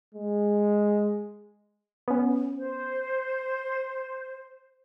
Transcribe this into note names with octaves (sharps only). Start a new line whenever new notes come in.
G#3
B3 C#4
C5